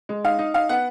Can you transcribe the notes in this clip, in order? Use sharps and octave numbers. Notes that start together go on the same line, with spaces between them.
G#3
D#4 F5
D#4
D#4 F5
B3 F#5